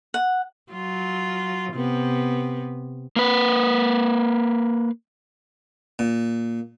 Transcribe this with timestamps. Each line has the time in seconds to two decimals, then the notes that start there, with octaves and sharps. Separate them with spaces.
0.14 F#5
0.72 F#3 F4
1.74 C3 B3
3.16 A#3 B4
5.99 A#2